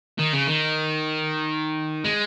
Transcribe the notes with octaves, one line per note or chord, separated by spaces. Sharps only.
D#3
C#3
D#3
G#3